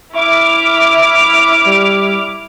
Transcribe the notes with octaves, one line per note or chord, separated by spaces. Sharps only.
E4 E5 D6 F6
G3